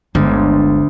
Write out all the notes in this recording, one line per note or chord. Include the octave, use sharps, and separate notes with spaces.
G1 D2 G#3